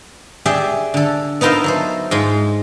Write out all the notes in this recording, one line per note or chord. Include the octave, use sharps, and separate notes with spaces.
G4 G#4 D5 E5 G#5
D3 A4
B3 D#4 F4 A#4 C5 E5
F#3 A4 C5
G#2 G#3 F4